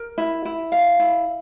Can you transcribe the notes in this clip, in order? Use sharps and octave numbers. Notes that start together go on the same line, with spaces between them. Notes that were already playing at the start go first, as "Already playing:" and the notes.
Already playing: A#4
E4
E4
F5
E4